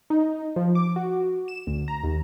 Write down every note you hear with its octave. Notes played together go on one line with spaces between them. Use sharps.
D#4
F3
D6
F#4
E7
D2
A#5
D#2